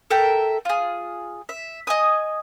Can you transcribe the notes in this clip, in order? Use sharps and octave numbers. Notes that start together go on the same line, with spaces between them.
A4 A#4 E5 G5
F4 G#4
E5
D#5 G#5 D#6